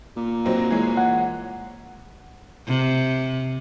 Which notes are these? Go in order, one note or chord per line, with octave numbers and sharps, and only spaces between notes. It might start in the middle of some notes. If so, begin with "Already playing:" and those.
A#2
F#3 C4 D#4
E3 G#3 C#5
F#5
C3